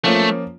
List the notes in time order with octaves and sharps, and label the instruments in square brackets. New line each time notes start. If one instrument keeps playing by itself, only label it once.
[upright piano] F3 A#3 C#4 F4 [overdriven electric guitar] A3